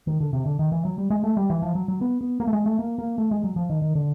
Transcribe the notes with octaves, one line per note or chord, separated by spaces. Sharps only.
D#3
D3
C3
D3
D#3
E3
F#3
G3
G#3
A3
G3
E3
F3
F#3
F#3
B3
B3
A#3
A3
G#3
A3
A#3
A#3
A3
G#3
F#3
F3
D#3
D#3
D3